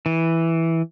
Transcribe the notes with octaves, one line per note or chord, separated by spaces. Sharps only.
E3